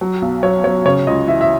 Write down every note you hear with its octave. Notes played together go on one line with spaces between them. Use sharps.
F#3
B1
F#3 C#5
F#3 C#5
C#3 C#5
C#2 D#5
E3 E5
E5